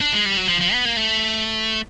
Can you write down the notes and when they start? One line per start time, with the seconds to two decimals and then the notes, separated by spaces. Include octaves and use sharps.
0.01 D4
0.13 G#3
0.26 G3
0.37 F#3
0.48 F3
0.61 F3
0.73 B3
0.85 A#3
0.97 A3